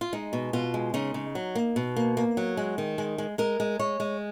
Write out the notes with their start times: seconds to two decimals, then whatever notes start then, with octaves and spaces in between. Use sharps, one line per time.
0.01 F4
0.13 G#3 D#4
0.33 B2
0.53 B2 F4
0.74 G#3
0.94 C#3 D#4
1.14 C#3
1.35 F#3
1.55 A#3
1.76 B2
1.96 A#3
2.17 A#3
2.37 F#3
2.57 G#3
2.78 D#3
2.98 G#3
3.18 G#3
3.38 G#3 A#4
3.60 G#3
3.79 G#3 C#5
4.00 G#3